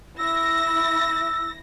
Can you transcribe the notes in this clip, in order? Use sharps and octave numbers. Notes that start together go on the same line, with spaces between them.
E4 E6 A#6